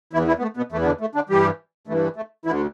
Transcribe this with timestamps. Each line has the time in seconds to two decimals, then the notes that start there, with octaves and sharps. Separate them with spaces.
0.13 E2 E3 E4
0.27 E3 E4
0.38 B3
0.42 A3
0.57 B2 B3
0.72 E2 E3 A3
0.82 B3
0.86 D3 D4
1.01 A3
1.15 D3 D4
1.29 G2 E3 G3 G4
1.87 G2 E3 A3
2.16 A3
2.45 D2 D3 E3 E4